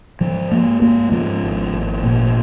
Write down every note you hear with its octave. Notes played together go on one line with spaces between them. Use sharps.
G#2 F3
G#2 A#3
G#2 A#3
G#2 F3
G#1
G#1
A#2